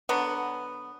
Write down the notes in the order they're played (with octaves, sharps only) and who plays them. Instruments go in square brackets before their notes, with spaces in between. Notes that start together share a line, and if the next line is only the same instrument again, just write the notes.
[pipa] D3 F#3 B3